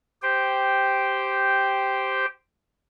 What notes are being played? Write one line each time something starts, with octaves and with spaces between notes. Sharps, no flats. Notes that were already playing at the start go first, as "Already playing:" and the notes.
G4 C5 G5